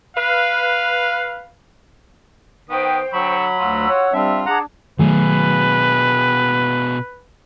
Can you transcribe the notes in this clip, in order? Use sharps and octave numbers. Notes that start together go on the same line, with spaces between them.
B4 F5
D#3 B3 C5 G5 D#6
D3 F#3 B5 C#6 E6
D2 F4 F#4 E6
C#5 F#5
G3 C4 D4 F4 E5
D4 G#4 F#5 A5 A#5 D6
B2 D#3 F#3 A3 G#4 B4